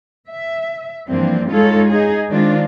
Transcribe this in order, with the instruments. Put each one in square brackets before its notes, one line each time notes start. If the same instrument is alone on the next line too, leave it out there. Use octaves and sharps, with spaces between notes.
[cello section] E5
G2 E3 F3 A#3 C4 D4
G#3 D#4 F4 A4 C#5
D#4 G#4
D#3 G#3 C4 D4 F4